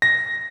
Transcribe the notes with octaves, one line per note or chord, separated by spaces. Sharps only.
A#6